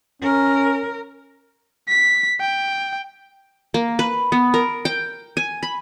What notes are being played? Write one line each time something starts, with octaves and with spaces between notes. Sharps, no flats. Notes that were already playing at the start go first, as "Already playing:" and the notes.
C#4 A#4
B6
G5
A#3
B4
B3
A#4
G5
G#5
B5